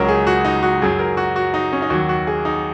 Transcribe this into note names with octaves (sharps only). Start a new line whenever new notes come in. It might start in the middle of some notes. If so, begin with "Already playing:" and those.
Already playing: C#2 C#3 F#3 A#4 C#5
G#4
F#4
D#4
F#4
F#2 F#3 G#4
A#4
F#4
F#4
D#4
C#4
D#4
D#2 D#3 F#3 F#4
F#4
G#4
D#4